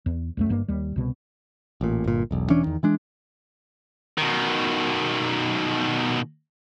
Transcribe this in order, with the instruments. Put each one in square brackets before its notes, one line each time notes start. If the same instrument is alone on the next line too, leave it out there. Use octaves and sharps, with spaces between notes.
[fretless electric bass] E2
C#2 F#2 A3
G1 G2 A#3
D#2 G3
C2 B2
[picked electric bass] A1 A#2
G1 A#2
E1 B1
E1 E3 C#4 D4
E2 D#3
E3 G#3 D4
[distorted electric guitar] B2 D#3